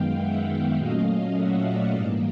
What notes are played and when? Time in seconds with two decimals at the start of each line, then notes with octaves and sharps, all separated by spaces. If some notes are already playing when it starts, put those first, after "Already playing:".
Already playing: F#2 D#3 G#3 B3 F5 G5
0.18 E5 F#5
0.77 A#2 F#3 A3 C#4 D#5 F5
1.35 E5 F#5
1.64 D5 E5
1.93 G#2 E3 G3 A#3 D#5 F5